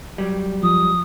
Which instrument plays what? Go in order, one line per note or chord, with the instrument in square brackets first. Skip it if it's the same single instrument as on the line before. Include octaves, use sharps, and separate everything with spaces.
[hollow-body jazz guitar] F#3 G3
[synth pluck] F3 [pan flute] D#6